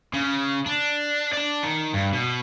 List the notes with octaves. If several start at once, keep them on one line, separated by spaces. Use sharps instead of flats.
C#3
D4
D5 A5
D#3
G2
B2